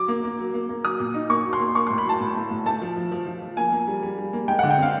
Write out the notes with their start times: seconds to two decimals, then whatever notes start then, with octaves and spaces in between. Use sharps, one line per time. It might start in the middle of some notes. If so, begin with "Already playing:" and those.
Already playing: F#3 D6
0.08 A#3
0.24 A#3
0.39 F#3
0.54 A#3
0.69 A#3
0.84 F#3 D#6
1.00 A#2
1.14 D#4
1.30 A#3 C#6
1.45 F#3
1.53 C6
1.60 A#3
1.75 A#3 C#6
1.87 C6
1.90 A2
1.98 B5
2.05 F#3 A5
2.21 A2
2.36 A2
2.51 A2
2.66 A3 A5
2.81 F3
2.96 F3
3.12 F3
3.26 F3
3.42 F3
3.57 A#3 G#5
3.72 A#3
3.87 G3
4.02 G3
4.18 G3
4.33 A#3
4.48 G#3 G5
4.59 F#5
4.63 D3
4.71 G5
4.78 C4 F5